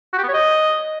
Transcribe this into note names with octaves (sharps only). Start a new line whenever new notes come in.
F#4
G4
B3
C#5
D#5